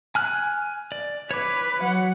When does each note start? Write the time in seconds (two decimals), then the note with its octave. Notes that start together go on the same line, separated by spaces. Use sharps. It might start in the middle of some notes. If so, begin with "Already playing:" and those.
0.15 G#5 F6 F#6
0.92 D5
1.31 B4 C#5 D6
1.80 F#3 F#5